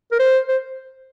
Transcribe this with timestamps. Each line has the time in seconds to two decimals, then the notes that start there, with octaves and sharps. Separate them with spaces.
0.12 A#4
0.19 C5
0.48 C5